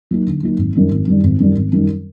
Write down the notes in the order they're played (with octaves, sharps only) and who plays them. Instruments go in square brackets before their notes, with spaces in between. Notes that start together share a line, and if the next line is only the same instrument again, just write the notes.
[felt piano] F#3 A#3 D#4
D3
F#3 A#3 D#4
G#1
F#2 D#3 G3
G#1
F#2 D#3 G3
G#1
F#2 D#3 G3
G#1
F#2 D#3 G3